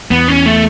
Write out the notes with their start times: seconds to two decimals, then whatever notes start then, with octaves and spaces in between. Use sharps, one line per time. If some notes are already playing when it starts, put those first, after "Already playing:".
0.11 E2 B3
0.28 C#4
0.46 A3